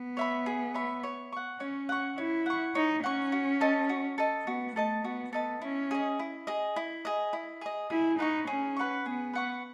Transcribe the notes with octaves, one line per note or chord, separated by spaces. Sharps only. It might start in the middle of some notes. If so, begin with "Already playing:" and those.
Already playing: B3
C#5 E5 B5
G#4
C#5 E5 B5
C#5
F#5 C#6
C#4 C#5
F#5 C#6
E4 C#5
F#5 C#6
D#4 C#5
C#4 F#5 C#6
F#4
A4 D#5 A5
F#4
A4 D#5 A5
B3 F#4
A3 A4 D#5 A5
B3 F#4
B3 A4 D#5 A5
C#4 E4
G#4 D#5
E4
G#4 D#5
E4
G#4 D#5
E4
G#4 D#5
E4 G#4
D#4 B4 F#5 C#6
C#4 G#4
B4 F#5 C#6
B3 G#4
B4 F#5 C#6